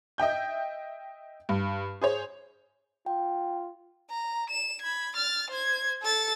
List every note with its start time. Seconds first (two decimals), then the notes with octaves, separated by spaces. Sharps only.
0.18 D#5 E5 G5 G6
1.49 G2
2.01 G#4 C5 C#5
3.06 F4 G5
4.10 A#5
4.50 E7
4.81 B5 G#6
5.16 F6 A6
5.50 C5 G#6
6.02 A4 A6